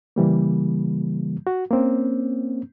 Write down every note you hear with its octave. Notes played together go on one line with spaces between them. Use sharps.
C#3 E3 G3 A#3
F#4
A#3 C4 C#4